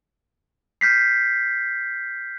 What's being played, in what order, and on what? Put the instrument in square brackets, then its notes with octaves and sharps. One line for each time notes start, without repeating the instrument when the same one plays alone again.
[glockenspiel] F6 G6 B6 C7